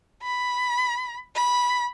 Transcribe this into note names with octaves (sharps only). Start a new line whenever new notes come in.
B5
B5